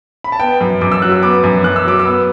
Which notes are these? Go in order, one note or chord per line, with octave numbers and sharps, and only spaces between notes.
B5
A5
B3 G5
F#2
F#2 D6
E6
F#3 F#6
E6
B3 D6
F#2
F#2 F#6
E6
F#3 D6
E6
B3